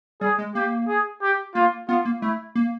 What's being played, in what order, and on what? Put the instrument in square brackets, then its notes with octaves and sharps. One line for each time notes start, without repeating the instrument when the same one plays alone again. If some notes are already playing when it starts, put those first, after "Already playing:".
[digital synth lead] G3 [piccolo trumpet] G#4
[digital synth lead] G#3
[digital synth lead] A#3 [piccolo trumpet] G4
[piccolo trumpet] G#4
G4
[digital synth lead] A#3 [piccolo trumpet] F4
[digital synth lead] B3 [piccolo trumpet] F4
[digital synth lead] A#3
[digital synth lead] A3 [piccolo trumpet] E4
[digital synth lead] A#3